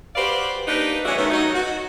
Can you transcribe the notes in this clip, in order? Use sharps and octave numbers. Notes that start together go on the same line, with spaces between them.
F#4 G4 B4 C5 D5 F5
A#3 D4 D#4 G4 B4
E3 F#3 A3 C#4 D4 F#4
D#3 A3 B3
F#3 D#4
F#4